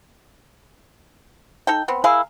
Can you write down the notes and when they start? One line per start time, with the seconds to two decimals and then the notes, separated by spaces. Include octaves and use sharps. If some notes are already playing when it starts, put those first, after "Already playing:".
1.67 D#4 A4 G5
1.88 B3 C4
2.04 E4 G#4 A#4 F5